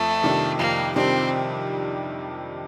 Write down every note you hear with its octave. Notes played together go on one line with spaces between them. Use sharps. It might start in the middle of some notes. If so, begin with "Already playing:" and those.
Already playing: F2 A3
C3 D#3 G3 D4
F2 A#3
C3 D#3 G3 C4 D4